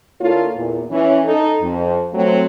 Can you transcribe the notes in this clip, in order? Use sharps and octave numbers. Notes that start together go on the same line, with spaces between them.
D3 A#3 E4 F4 A4 C#5
E2 A#2
E3 C#4
D#4 A4
F2
F#3 A3 C4